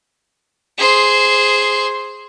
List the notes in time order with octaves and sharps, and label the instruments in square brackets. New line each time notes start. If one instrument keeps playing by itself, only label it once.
[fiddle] G#4 C5